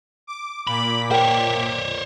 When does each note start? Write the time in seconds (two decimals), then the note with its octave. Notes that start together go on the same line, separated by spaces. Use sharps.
0.27 D6
0.67 A#2 B5 D6 B6
1.11 A#4 C5 C#5 G5